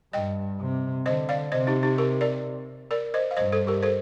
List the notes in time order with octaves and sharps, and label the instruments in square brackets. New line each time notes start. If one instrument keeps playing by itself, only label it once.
[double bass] G2 [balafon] D#5 G5
[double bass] C3
[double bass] D3 [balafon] C5 D#5
[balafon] D5 F5
[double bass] C3 [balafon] C5 D#5
[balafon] D#4 G4
D#4 G4
G4 A#4
A#4 D5
A#4 D5
C5 D#5
F5
[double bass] G2 [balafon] C5 D#5
[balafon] A4 C5
G4 A#4
A4 C5